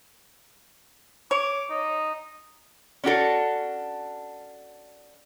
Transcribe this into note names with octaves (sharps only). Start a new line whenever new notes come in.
C#5 D6
D#4
C#4 D4 F#4 A4